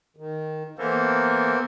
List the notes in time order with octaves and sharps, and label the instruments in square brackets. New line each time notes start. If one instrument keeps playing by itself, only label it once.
[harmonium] D#3
[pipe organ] E3 A#3 A4 [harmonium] B3 A#4 C5